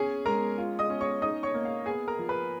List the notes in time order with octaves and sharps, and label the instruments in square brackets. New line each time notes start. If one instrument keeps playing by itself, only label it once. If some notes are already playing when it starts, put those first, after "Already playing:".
Already playing: [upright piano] C#4 G#4 G#5
G#3 A#4 A#5
F4
D#5 D#6
C#4
C#5 C#6
D#4 D#5 D#6
C#5 C#6
A#3
F5
B3 G#4 G#5
A#4 A#5
F3
B4 B5